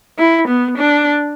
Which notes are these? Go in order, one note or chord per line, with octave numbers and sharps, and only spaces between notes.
E4
B3
D4